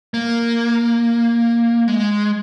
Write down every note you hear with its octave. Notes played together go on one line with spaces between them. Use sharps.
A#3
G#3